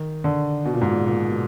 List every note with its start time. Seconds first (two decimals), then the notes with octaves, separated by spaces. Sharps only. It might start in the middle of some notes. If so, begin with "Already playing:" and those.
Already playing: D#3
0.24 D3
0.65 B2
0.73 A#2
0.81 G#2
0.90 A#2
1.07 A#2
1.28 B2